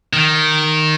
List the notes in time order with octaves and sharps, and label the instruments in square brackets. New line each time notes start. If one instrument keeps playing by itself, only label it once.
[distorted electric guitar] D#3